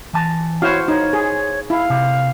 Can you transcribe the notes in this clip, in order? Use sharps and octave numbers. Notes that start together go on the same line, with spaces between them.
E3 A5
E4 F#4 C5 C#5 F5
D#4 C#5
G#4
E4 F5
C3